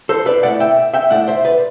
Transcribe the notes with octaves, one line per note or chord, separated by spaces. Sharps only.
A4 C5
B4 D5
B2 A3 E4 D5 F#5
E5 G5
E5 G5
B2 A3 E4 D5 F#5
C5 E5
B4 D5